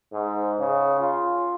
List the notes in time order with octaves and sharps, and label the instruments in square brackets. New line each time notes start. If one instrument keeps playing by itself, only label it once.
[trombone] G#2
C#3
F4